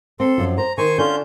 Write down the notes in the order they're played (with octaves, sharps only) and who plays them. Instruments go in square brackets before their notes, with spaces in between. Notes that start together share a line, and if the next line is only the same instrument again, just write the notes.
[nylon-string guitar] C4 [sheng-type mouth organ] A4 C6
[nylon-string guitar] F#2 F3
[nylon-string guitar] C5 [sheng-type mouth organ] A#5
[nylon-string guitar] D#3 [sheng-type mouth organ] C5 G#5 C#6
[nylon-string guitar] D3 [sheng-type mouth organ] C#4 F4 G6